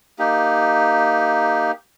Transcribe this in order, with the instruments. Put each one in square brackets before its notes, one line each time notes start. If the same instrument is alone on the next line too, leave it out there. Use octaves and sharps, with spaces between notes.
[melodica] A#3 D#4 G4